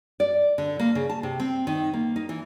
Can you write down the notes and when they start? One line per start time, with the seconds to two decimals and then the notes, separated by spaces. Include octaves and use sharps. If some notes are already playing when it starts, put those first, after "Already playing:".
0.20 D5
0.58 D3
0.79 A#3
0.95 C#3
1.09 A5
1.23 C3
1.40 C4
1.67 D#3
1.93 A#3
2.16 D#4
2.29 E3